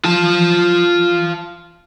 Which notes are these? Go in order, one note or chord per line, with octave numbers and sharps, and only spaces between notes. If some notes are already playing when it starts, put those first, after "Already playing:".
F4 A5